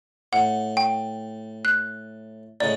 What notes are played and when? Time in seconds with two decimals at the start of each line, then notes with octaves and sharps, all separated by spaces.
0.33 A2 F#5
0.77 G5
1.65 F#6
2.60 A2 C#3 G#3 D5